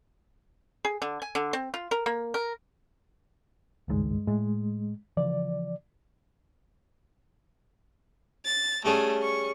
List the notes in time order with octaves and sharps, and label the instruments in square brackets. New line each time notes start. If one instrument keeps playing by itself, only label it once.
[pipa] G#4
D3
G#5
D3
C4
F4
A#4
A#3
A#4
[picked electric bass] G#1 C#2 D#3 [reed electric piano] G2 G#3
[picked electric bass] A2 [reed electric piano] G#3
[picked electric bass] C#3 E3 F3 [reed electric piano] D5
[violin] A6
[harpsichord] G3 C#4 G#4 [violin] A3
[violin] C#6